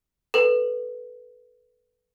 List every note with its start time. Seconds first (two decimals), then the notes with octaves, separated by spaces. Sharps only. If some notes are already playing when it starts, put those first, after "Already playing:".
0.34 A4 B4